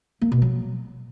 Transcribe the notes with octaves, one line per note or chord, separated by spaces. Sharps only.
A#3
B2
F#3